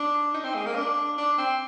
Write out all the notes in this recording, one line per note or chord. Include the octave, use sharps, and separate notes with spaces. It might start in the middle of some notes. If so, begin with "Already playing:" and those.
Already playing: D4
D#4
C4
G#3
A#3
D4
D4
C4